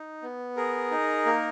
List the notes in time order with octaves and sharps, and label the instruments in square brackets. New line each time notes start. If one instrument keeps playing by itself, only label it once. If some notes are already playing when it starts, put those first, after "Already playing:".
Already playing: [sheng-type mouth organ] D#4
B3
G#4 A#4
D#4
A#3